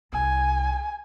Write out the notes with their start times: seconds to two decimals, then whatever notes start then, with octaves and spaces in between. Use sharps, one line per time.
0.13 C2 G#5